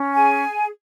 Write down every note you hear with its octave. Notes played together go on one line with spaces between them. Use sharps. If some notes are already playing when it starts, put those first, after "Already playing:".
Already playing: C#4
G#4 G#5